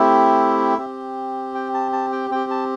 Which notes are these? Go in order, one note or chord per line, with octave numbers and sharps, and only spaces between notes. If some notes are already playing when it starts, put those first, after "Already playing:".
Already playing: A3 C4 E4 G4 E5
C4 G4
G5
A5
A5
G5
C4 G4 G5
A5